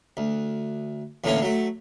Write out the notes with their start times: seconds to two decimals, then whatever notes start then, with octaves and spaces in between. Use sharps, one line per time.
0.17 D2
1.24 E2 A2 D3 E3 A#3 C#4
1.42 F#3 A3